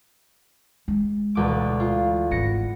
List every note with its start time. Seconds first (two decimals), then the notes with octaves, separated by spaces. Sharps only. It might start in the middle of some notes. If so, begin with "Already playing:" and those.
0.88 G#3
1.35 E1 D2 D6
1.80 F4
2.31 G#1 B3 A#6 C#7